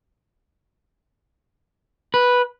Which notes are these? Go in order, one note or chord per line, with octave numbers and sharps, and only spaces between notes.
B4